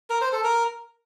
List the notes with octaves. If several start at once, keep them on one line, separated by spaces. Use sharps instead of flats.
A#4
C5
A4
A#4